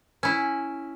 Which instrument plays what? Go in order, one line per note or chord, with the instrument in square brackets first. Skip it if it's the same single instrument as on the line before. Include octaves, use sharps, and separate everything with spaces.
[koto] C#4 E4